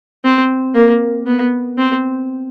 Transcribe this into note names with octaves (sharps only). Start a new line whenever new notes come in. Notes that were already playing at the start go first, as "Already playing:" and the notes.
C4
A#3
B3
C4